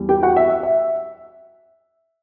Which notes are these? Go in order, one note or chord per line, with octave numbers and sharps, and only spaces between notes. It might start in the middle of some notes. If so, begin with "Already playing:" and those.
Already playing: E2 G3
G4 G5
F#4 F#5
E5
E5
E5